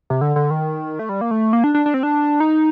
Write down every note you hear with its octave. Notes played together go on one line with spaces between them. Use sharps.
C3
D3
D3
D#3
A3
G3
A#3
A3
A#3
D4
D4
D4
C4
D4
D#4